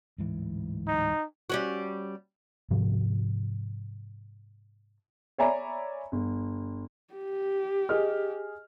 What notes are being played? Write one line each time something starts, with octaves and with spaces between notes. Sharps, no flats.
D1 G#2 E3
D#4
G3 C#4 F#4
G#2 C3 F3 F#3
C#5 D5 E5 G#5 A#5 B5
G1
G4
G#4 D#5 F6